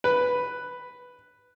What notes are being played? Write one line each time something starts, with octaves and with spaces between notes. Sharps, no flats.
B4